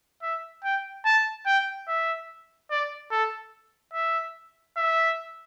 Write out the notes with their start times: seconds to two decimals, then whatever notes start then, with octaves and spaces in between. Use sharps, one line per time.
0.22 E5
0.63 G5
1.05 A5
1.46 G5
1.88 E5
2.71 D5
3.11 A4
3.93 E5
4.77 E5